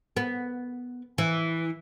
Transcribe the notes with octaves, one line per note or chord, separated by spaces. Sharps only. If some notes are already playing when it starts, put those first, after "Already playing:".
B3
E3